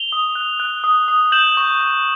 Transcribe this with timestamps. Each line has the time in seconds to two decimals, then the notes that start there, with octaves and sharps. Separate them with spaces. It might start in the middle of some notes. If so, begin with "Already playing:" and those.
Already playing: F7 G7
0.12 D#6
0.35 F#6
0.60 F#6
0.84 D#6
1.08 D#6
1.32 G6 E7 F#7
1.57 C#6
1.81 C#6